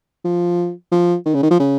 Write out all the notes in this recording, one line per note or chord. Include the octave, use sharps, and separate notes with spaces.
F3
F3
D#3
C#3
D#3
F3
C#3